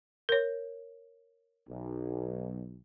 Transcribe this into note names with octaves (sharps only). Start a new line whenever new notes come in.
A#4 C#5
B1